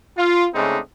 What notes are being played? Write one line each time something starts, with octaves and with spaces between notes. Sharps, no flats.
F4
C#3 G#3 A3 C4 D4 D#4